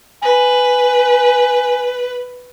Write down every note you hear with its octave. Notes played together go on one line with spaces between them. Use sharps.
B4 G#5